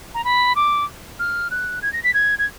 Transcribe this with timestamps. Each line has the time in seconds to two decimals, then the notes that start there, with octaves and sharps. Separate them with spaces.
0.14 A#5
0.24 B5
0.56 D6
1.19 F6
1.51 F#6
1.82 G#6
1.93 A#6
2.04 B6
2.14 G#6
2.39 G#6